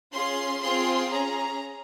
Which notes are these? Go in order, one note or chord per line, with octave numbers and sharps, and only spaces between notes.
C#4 F4 G#4 C6
C4 F4 G#4 C6
C#4 G#4 A#5